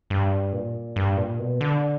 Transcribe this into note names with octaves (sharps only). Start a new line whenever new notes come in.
G2
A#2
G2
A#2
B2
D3